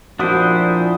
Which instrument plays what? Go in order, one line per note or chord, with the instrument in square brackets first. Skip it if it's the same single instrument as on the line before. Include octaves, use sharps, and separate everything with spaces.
[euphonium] A#2 [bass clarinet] F3 [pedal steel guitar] D4 E4 C5 [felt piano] F#4 D#6